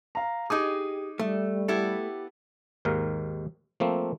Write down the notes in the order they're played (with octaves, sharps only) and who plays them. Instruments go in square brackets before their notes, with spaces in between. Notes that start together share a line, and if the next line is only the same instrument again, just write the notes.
[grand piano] F5 A#5
[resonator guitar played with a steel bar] D#4 G#4 [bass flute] G4 [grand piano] D6 D#6
[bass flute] G3 [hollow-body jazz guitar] A3
[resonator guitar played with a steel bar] B3 E4 A4 [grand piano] G4
[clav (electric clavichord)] D#2 G#2 D#3 A#4 F5
F3 A3 A#3 C4